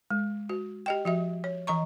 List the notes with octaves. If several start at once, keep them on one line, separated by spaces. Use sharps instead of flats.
G#3
F#4
G4 D#5 G5
F3 F#4 E5
C#5
E3 D#5 A#5 C#6